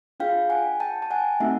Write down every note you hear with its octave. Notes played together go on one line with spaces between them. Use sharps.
D4 F4 G#4 F5 G5
F#5 G#5
G5 A5
A5
F#5 G#5
A3 C4 D#4 F#4 A4 E5 F#5